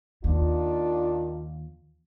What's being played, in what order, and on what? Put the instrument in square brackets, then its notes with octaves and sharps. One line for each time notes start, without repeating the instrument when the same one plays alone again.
[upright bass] D#2 [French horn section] D#3 D4 F4